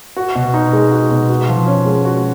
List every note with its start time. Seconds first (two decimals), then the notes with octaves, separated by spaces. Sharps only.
0.16 F#4
0.35 B2
0.54 D#4
0.73 G#3
0.92 F#4
1.11 B2
1.29 F#4
1.49 F3
1.67 C#4
1.86 G#3
2.05 F#4